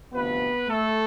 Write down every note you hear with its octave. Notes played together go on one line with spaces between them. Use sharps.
D2 C3 F3 B3 B4
A3 A4